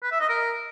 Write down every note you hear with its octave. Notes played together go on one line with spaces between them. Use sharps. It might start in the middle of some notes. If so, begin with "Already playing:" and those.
B4
E5
D#5
A#4